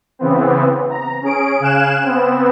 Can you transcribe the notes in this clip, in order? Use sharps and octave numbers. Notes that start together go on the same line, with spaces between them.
C#3 E3 B3 C4
A#5
C#4 G#4 D7
C#3 F5 G#5 F#6 E7
B3 C4